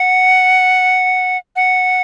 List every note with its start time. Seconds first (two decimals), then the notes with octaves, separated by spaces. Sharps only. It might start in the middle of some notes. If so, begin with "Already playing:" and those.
Already playing: F#5
1.56 F#5